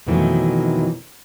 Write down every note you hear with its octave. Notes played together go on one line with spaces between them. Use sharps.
F2 B2 D#3 E3 F#3 A3